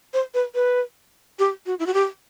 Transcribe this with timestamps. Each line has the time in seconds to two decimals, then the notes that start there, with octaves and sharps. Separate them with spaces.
0.13 C5
0.34 B4
0.55 B4
1.39 G4
1.66 F#4
1.79 E4
1.86 F#4
1.94 G4